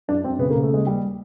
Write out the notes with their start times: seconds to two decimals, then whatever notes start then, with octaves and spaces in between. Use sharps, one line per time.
0.08 F#2 D4
0.24 F#2 C4
0.39 C#3 B3
0.51 A#3
0.55 C#3
0.63 A3
0.70 D#2 G#3
0.87 D#2 G3